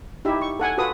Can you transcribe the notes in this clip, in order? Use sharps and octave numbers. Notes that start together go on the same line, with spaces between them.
D#4 E4 G4 E5
C#6
A4 F#5 G#5
F4 F#4 A4 B4 D#6